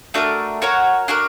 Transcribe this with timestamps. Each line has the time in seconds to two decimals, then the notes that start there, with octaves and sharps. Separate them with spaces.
0.14 A3 D4 F#4 A#4
0.62 F#4 A#4 C#5 F#5
1.08 D4 F#4 A#4